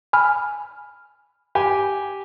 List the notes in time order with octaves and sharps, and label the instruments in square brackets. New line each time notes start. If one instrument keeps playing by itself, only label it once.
[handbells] G#5 B5 F6
[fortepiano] G4 G#5